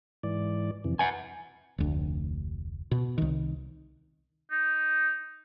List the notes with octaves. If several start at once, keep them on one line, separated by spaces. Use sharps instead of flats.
G#2 E3 D5
F2 C3 E3
B4 F#5 G#5
F1 D2
B2
C2 D#3
D#4